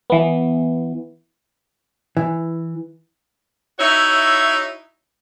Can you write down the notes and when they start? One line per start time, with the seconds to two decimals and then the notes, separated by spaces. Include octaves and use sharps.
0.10 E3 B3
2.17 E3
3.80 D#4 E4 F#4 C#5 E5